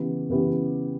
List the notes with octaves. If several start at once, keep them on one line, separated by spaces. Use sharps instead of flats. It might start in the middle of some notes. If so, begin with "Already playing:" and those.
Already playing: C#3 E3 B3 E4 G4
C#3 E3 B3 E4 G4